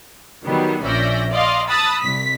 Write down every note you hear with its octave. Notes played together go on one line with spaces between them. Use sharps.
D#3 F#3 G3 B3
A#1 C#4 D5 E5 G6 A#6
D5 D#5 F5 C6
A5 B5 D#6 E6 F#6 A6
C2 B6